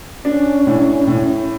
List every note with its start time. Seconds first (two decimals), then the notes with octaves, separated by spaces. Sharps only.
0.25 C#4 D4
0.67 A2
1.07 A2